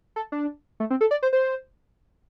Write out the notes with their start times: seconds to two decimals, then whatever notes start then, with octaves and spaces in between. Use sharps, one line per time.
0.16 A4
0.32 D4
0.80 A3
0.90 C4
1.01 A4
1.11 D5
1.23 C5
1.33 C5